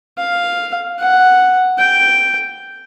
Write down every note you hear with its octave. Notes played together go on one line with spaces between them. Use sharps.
F5
F#5
G5